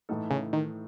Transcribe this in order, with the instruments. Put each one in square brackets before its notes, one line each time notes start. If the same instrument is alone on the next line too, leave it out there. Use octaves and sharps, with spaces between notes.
[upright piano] A2 E3 A3 D#4 A4
[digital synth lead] C#3
D#3